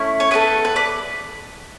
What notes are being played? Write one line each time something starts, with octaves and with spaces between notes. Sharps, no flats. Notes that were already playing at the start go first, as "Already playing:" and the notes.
Already playing: A3 C#4 E4
C#5
B3 F#4 A4 B4
B4
B4 D5